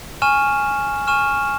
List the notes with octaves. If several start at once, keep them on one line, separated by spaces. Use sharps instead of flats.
G#5 C#6 F6 E7
G#5 C#6 F6 E7